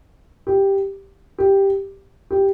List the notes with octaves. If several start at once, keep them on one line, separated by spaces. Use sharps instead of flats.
G4
G4
G4